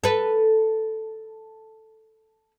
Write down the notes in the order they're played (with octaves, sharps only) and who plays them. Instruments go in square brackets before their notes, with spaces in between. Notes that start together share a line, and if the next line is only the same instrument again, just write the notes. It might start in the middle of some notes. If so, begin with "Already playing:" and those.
[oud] A4 B4